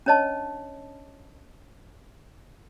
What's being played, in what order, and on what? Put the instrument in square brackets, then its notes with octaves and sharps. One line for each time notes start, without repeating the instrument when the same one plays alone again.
[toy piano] C#4 D4 C#5 D#5 A5